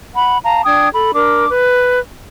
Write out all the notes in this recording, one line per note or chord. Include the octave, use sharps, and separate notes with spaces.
F#5 B5
F5 A5 A#5
D4 G5 D#6 G#6
A4 B5
D4 A#4 D6
B4